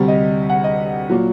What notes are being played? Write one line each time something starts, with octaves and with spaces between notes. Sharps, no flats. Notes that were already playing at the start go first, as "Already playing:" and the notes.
Already playing: D2 C3 G3
D#5
F#5
D#5
A#2 F#3